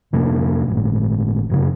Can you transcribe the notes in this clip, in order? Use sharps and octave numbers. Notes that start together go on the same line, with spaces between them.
F2 C3 A#3 D4
G1 A2
F1 F#2 C#3